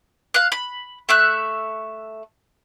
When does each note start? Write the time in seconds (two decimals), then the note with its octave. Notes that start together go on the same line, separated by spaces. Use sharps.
0.34 F5 F#6
0.52 B5
1.09 A3 E5 F#6